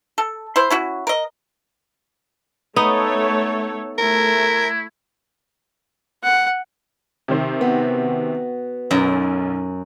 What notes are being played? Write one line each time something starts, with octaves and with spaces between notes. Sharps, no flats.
A4
E4 C5
C#4 E4 F#4
A#4 D#5
A3 B3 D#4 A4 C#5
A3 E4 A#4
F#5
C3 D#3 C5
B3 F#4
B1 F#2